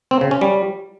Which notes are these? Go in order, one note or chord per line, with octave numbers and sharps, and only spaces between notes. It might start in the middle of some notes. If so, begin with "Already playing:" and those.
C4
C#3
C#4
G3